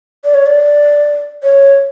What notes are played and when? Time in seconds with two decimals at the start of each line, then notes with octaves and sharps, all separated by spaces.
0.24 D5
0.34 C#5
0.46 D5
1.43 C#5